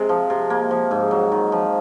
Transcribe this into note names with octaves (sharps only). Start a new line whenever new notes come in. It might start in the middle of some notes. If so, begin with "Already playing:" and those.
Already playing: C3 G#3
F3
C3
A#3
F3
G#2
F#3
D#3
F3